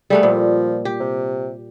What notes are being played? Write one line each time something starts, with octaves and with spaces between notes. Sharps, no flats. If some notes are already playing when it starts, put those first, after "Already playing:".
G3 A3 B3 G#4
A#2 F3
G4
C3